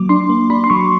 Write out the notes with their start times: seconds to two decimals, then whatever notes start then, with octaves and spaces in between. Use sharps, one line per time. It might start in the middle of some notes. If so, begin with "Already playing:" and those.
Already playing: F#3 A#3 D6
0.09 D4 C6
0.29 A#3
0.50 D4 B5
0.64 C6
0.70 F#3 C#6